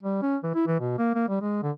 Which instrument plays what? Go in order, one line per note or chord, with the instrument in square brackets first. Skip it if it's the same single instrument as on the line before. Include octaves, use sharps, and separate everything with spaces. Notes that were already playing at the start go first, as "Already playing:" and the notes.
[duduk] G3
C#4
E3
E4
E3
B2
A#3
A#3
G3
G#3
D3